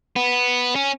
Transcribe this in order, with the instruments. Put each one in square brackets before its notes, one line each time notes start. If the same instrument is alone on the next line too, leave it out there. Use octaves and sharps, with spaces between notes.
[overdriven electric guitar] B3
C#4